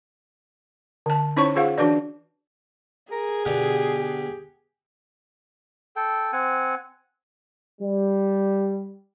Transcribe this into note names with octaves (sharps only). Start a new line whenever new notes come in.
D3 A5
C#4 D#4 E4 C5 C#5 C#6
F4 G#4 C5 F5 F#5
E3 D4 F#4 B4 D5
G#4 A#4
B2 D3 G4 D#6
A4 G5
C4 F#5 G#5
G3